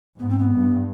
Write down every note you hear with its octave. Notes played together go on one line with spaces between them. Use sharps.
G#2 B3
C4
B3
G2